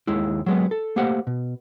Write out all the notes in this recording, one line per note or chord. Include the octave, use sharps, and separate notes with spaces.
D#2 D#3 G#3 E4
F#3 G#3 B3
A4
A3 A#3 G4 C5 F#5
B2